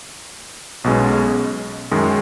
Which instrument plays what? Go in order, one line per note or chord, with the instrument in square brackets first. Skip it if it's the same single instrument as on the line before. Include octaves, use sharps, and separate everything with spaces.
[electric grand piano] B1 B2 G#3 C#4
F#2 D#3 G#3